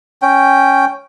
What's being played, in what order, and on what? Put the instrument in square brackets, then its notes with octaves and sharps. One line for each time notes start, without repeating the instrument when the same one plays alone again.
[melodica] C#4 G5